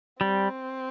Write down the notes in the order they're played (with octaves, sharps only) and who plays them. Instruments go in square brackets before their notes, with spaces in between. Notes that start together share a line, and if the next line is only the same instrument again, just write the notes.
[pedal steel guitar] G3 [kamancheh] C4